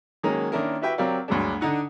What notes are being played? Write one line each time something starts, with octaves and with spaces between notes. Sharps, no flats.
D#3 F#3 G#3 A#3 C#4 D#4
D#3 A#3 C#4 D4 E4 A#4
E4 F#4 G4 B4 E5 G5
F#3 C4 G4 A#4 D5 F5
D2 G2 F#3 G#3 D4
D3 D4 D#4 F#5 D#6